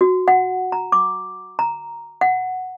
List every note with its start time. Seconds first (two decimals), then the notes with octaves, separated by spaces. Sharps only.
0.01 F#4
0.28 F#5
0.72 A#5
0.92 D6
1.59 A#5
2.21 F#5